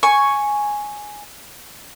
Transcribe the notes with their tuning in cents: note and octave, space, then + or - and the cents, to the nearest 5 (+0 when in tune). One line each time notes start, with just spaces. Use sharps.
G#5 +0 C#6 +0